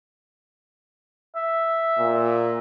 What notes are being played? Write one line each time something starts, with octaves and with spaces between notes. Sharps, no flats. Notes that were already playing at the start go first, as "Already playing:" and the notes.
E5
A#2